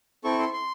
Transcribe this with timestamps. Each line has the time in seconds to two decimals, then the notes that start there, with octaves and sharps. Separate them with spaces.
0.24 C4 E4 A4 C#6
0.39 C6
0.53 C6